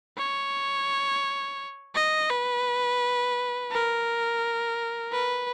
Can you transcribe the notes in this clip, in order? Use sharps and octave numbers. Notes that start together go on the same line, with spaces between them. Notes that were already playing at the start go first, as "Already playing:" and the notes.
C#5
D#5
B4
A#4
B4